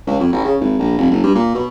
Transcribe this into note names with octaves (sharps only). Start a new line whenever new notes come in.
C#2
F2
A1
C#3
G#1
A#1
F1
F#1
G2
A#2
B2